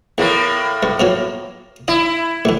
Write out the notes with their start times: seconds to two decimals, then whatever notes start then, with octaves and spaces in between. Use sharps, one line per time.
0.18 E2 A2 A#3
0.83 G2
1.00 B2 F3 F#3
1.88 E4 D#5
2.45 A1 D3